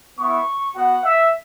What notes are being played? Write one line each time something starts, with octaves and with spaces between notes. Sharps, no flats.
B3 E4 C#6
B3 F#4 F#5
E5